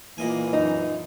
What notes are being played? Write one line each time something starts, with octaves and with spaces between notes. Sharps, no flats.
A#2 E3 A#3 D#5 G#5
F#2 D#4